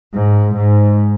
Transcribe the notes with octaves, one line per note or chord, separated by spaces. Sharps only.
G#2
G#2